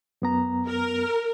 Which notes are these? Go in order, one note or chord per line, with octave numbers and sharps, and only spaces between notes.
F#2 B3 A#5
A#4